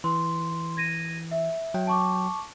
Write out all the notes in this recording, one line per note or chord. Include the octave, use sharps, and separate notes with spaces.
E3 C6
G#6 A#6 D#7
E5
F#3 G5
A5 C#6 D6